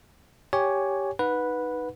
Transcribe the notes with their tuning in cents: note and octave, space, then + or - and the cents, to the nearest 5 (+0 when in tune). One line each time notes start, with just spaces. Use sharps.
G4 +0 C#5 +5 G#5 +0
D#4 +0 B4 -5 F#5 -20